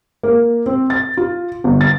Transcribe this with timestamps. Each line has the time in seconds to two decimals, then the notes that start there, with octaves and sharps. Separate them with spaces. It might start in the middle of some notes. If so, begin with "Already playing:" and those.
0.23 A#3
0.66 C4
0.90 A6
1.17 F4
1.64 G1
1.81 A6